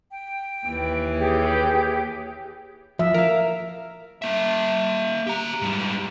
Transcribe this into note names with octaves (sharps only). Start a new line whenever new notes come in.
G5
D#2 E3
G4 G#4 C#5
F3 E5
A#4 F5
A#3 E5
G4 A#5
G#2 G3